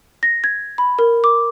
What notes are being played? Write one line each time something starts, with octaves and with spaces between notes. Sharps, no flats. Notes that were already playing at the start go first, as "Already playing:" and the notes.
A#6
G#6
B5
A#4
D6